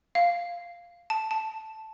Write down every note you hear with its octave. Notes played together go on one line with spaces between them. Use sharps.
F5
A5
A5